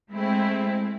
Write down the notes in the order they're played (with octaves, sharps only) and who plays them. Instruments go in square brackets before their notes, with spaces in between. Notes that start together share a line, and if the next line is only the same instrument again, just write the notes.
[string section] G#3 A3 C4 E4